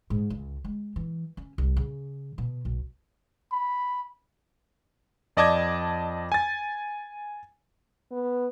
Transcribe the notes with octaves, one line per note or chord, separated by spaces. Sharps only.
G#2
C#2
G#3
E3
C#4
C2
C#3
B2
B1
B5
F2 D5 D#5 A5 D6 G#6
G#5 A6
B3